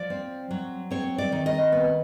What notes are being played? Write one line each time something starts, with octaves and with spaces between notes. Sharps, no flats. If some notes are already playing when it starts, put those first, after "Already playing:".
Already playing: F3 D5
C4
F#3
C4 C#5
D5
D#3
D#5
B3